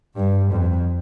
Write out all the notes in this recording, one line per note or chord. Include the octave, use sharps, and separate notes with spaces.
G2
F2